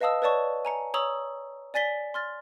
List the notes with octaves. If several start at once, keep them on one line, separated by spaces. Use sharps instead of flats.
B4 D#5 F5 A5 D#6 E6
B4 C#5 D5 A5 C#6
G#5 A#5 C#7
C#5 A#5 C#6 D#6 E6 F#7
D5 G#5 A6 B6 G7
C6 F6 A6